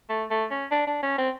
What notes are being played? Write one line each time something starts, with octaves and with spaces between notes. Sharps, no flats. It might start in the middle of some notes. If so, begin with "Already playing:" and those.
A3
A3
C#4
D4
D4
C#4
C4